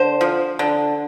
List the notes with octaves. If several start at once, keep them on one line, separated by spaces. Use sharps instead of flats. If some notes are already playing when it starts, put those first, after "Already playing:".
Already playing: D3 C5
F3
D3